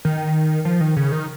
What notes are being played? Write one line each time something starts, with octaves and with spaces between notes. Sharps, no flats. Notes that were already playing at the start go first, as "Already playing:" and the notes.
D#3
F3
D#3
C#3
D#3